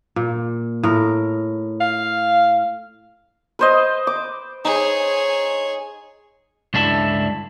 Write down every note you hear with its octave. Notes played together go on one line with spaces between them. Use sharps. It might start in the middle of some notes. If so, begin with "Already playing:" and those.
A#2
A2 A#4
F5
B4 C5 D#5
D6
D#4 G#4 C#5
C#2 G2 D4 E4 A4 E5